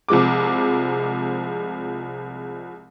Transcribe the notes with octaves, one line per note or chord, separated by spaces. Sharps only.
C2 F3 G#3 D6